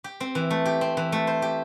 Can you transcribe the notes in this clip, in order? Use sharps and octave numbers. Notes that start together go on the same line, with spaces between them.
G4
C4
E3
A3
G4
C4
E3
A3
C5
G4